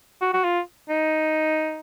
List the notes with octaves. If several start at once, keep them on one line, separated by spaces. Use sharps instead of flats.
F#4
F#4
F4
D#4